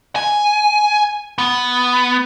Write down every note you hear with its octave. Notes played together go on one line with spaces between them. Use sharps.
G#5
B3